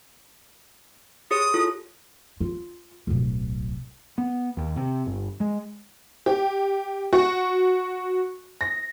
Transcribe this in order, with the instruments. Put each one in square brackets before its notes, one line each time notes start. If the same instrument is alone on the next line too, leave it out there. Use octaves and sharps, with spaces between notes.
[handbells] G4 G#4 C#5 [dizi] D#6
[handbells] E4 F4 A4
[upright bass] F4
D1 B1
[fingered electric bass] B3
D#2
C3
G1
G#3
[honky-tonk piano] G4
F#4
A#6